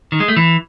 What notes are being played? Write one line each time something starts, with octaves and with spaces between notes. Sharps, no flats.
D#3
G#3
A3
E3